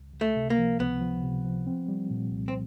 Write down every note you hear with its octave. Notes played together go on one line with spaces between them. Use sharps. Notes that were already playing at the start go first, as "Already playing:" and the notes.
Already playing: C#2
C#2
A3
C3
A#3
F3
C#2 B3
F3
C3
F3
C4
G3
A#2
C2
C4